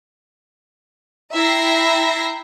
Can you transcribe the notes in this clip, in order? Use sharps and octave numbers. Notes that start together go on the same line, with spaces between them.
E4 E5 G5 A#5 A#6 C7